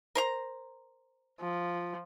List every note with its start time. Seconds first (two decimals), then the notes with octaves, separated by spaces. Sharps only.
0.15 A#4 C5 A#5
1.40 F3